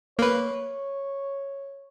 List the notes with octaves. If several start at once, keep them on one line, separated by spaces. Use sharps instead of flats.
A#3 B4 C#5